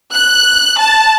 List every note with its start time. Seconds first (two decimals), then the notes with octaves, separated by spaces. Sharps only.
0.13 F#6
0.78 A5